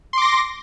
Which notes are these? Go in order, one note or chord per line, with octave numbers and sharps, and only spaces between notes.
C6 D6 A#6